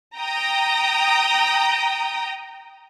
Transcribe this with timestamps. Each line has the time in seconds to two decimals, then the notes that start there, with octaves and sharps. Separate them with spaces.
0.19 G5 A#5 D#6